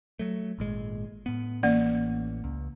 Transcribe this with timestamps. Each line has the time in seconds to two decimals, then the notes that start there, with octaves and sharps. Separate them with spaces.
0.19 F#3 A3
0.59 G#1 A#2 G#3
1.26 A2 B3
1.63 A1 E3 A#3 C#4 D5
2.44 C#2